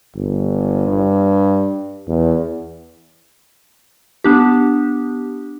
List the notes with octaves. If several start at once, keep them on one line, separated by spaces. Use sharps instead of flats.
G1
G2
E2
B3 D4 G4